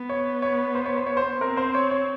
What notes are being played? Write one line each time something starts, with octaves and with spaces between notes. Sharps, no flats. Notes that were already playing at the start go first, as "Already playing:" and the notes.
Already playing: B3
C#5
C#5
C5
C#5
C5
C#5
C5
C4 A#4
C5
C#5
C#5